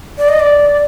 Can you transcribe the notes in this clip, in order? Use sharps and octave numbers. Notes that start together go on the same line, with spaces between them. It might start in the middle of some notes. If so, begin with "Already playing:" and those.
D5
D#5
D5